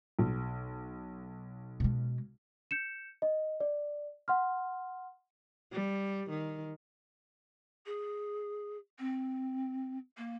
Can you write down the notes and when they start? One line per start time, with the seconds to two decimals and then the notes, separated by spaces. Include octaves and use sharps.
0.19 B1
1.80 B2 G#3
2.71 G6 C#7 E7
3.22 D#5
3.60 D5
4.28 F#5 C6 F6
5.72 G3
6.30 D#3
7.86 G#4
8.99 C4
10.17 A#3